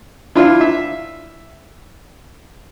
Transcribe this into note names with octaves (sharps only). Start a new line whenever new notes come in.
D4 E4 F4
E5